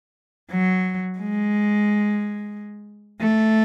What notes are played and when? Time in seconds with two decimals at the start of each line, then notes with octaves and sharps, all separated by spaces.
0.51 F#3
1.18 G#3
3.21 A3